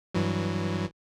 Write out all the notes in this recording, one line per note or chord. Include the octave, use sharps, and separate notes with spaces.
G2 E3 F#3